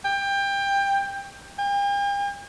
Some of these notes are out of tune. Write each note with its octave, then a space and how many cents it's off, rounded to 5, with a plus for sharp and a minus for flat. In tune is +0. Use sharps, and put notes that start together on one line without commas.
G5 +20
G5 +45